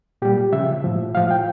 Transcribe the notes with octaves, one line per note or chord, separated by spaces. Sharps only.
A#2 G3 G4
C#3 F3 E5
A2 F3
A2 F3 F5
G5